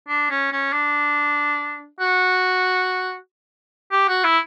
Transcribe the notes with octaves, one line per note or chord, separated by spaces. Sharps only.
D4
C#4
C#4
D4
F#4
G4
F#4
E4